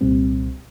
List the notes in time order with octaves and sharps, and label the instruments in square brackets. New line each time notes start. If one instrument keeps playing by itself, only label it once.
[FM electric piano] C2 A#2 G3 C4